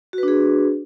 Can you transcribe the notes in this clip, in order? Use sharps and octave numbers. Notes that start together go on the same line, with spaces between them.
D4 F#4 G#4 B4